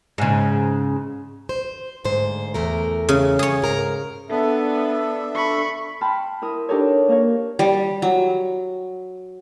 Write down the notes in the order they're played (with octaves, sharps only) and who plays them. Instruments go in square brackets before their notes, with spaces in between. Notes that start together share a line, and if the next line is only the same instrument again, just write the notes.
[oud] G#2 C#3
[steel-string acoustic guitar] C5
D2 G#2 C5
E2 A3 A#4
[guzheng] C#3
G#4 C#5
[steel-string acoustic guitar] G#2 A#4 A#5
[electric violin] B3 [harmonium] D4 A4 E5
[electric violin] B5 C#6
[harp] G5 A5 B5 C6 F6
E4 A#4 D#6
D4 D#4 G4 A4 A#4 C#5
A#3 A#4 C#5
[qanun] G3
F#3